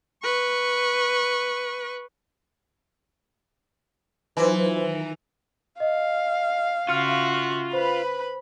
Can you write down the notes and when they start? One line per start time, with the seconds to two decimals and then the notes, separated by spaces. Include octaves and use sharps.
0.23 B4 C#6
4.37 E3 F#3 D#4 F4 B4 C5
4.76 D#3 A#5
5.80 D#5 F5
6.89 C#3 F4 F#4 E5 F6 C#7
7.73 B4 C5 B5